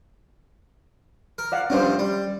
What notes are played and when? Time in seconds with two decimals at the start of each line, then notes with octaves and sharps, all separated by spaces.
1.38 A#4
1.52 D5 F5 F#5
1.70 G2 C3 F3 C#4 D4 C5
1.99 G3